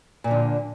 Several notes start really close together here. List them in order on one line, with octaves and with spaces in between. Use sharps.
A#2 F3 D3